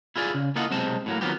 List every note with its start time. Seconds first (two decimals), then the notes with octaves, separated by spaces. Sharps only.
0.16 E4 F4 G#4 D5
0.34 C#3
0.56 A#3 E4 F4 A4 D#5 F#5
0.71 B1 C3 G#3 C4 A5
1.06 A2 F#3 A#3
1.21 D#3 F3 F#3 B3 C4 G4